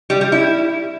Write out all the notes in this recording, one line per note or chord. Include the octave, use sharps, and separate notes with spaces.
G3
G3
E4